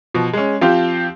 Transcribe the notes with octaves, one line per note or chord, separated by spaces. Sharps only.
B2 F3
G#3 C#4
F3 C4 F4 G4